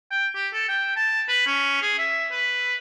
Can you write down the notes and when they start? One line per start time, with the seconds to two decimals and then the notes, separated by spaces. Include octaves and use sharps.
0.11 G5
0.35 G4
0.53 A4
0.68 G5
0.96 A5
1.28 B4
1.47 C#4
1.82 G#4
1.98 E5
2.32 B4